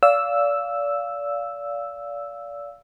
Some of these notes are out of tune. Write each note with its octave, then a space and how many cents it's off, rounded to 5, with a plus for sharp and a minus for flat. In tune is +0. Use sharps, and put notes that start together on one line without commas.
D5 -30 F5 +0 E6 +0